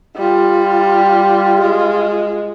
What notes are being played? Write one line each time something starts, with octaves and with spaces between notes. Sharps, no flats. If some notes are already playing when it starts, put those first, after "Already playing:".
G3 F4
G#3